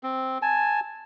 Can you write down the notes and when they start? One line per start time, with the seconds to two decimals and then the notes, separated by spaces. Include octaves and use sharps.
0.03 C4
0.42 G#5 A5